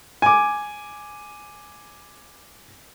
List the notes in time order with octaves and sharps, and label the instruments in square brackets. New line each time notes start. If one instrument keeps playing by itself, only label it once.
[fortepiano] G#5 D6